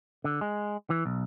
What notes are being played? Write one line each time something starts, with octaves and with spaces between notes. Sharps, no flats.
D3
G#3
E3
B1